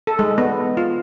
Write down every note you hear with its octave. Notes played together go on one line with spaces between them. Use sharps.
A4
G#3
B3
F4